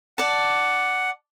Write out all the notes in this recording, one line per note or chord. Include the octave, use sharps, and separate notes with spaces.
D5 F#5 A5